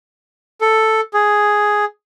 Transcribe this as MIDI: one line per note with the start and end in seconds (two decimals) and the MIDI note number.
0.61 1.01 69
1.14 1.85 68